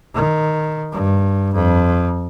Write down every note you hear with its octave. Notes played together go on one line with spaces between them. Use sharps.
D#3
G2
F2